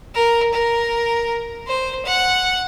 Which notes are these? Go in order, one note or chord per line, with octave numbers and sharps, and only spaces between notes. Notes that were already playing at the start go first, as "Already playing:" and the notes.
A#4
A#4
C5
F#5